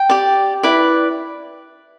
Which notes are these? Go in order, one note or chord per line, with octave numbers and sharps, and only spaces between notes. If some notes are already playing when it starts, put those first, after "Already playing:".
Already playing: G5
G4 D5
E4 B4 D5